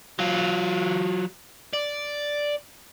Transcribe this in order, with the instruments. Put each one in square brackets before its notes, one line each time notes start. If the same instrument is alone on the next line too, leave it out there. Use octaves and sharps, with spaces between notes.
[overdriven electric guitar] F#3 F4
D5